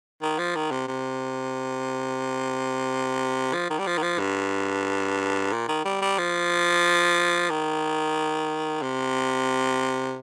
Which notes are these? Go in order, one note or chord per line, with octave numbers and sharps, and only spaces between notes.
D#3
F3
D#3
C3
C3
F3
D#3
G3
F3
D#3
F3
G2
A#2
D#3
G3
G3
F3
D#3
C3